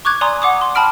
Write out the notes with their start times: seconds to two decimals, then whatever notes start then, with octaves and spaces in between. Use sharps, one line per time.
0.05 C#6 D6 F#6 G#6
0.21 D5 G#5 A#5 C6 D#6
0.42 F#5 D6 D#6
0.61 C6
0.75 G5 A5 B5 F6 D7